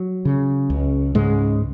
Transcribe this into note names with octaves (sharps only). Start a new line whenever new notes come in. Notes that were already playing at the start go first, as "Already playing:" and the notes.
Already playing: F#3
C#3
C#2
G#2 C#3 G#3